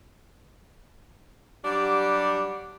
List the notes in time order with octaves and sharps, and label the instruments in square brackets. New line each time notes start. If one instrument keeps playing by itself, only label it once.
[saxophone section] F#3 G3 D4 G4 F#5